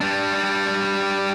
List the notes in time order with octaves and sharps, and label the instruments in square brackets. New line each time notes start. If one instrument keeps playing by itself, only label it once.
[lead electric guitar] G3 D4